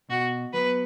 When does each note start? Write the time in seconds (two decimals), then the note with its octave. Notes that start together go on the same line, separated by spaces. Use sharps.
0.09 B2 F#4
0.53 F#3 B3 B4